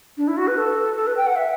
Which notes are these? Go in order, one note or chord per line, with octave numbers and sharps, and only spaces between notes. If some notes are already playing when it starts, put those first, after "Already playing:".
D4
E4
F#4
B4
A4
A4
B4
G5
F#5
E5